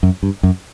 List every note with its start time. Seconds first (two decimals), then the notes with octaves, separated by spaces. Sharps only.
0.03 F#2
0.23 G2
0.43 F#2